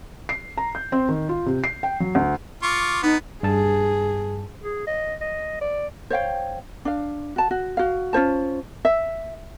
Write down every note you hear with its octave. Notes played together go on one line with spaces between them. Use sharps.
C7
A#5
G6
C4
D#3
F4
C3
C7
G5
F#3
D2
F4 C#6 D6
B3 D#4
G2 G#4 A5
G#4
D#5
D#5
D5
C5 C#5 F5 G5
D4 F5
F#4 A5
F#4
F#4 F5
C#4 F4 C5 A5
E5